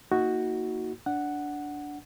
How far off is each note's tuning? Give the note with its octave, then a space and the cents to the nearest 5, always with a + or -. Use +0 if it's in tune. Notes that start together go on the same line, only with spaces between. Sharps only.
A#3 +0 D#4 +40 F#4 +0
D4 -10 F#5 +0